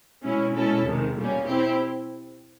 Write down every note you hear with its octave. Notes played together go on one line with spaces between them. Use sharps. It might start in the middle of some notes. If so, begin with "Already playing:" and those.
B2 G#3 C#4 E4
B2 G#3 C#4 E4 A4
E2 C3 D#3 G#3
B2 G3 A#3 C#4
C4 E4 G4